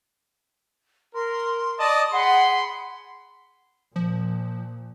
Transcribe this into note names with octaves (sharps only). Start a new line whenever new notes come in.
A#4 C6
D5 D#5 A5 D#6
G#4 F#5 B5 C6
A#2 F3